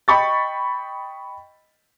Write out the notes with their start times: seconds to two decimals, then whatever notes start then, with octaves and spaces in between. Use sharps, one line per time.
0.08 D#5 G5 B5 C#6 A6